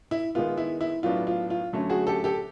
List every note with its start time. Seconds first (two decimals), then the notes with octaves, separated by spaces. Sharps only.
0.11 E4
0.35 D#3 G#3 B3 F4
0.57 E4
0.81 E4
1.03 A2 F#3 B3 D4 F4
1.27 F4
1.50 F4
1.73 D3 F#3 A3 C#4
1.89 F#4 G#4
2.07 G4 A4
2.24 G4 A4